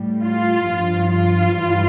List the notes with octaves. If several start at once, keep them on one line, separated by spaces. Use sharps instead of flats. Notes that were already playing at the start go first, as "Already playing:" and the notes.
Already playing: A2 G3
F4
G2 F3
F4
G2 E3 G3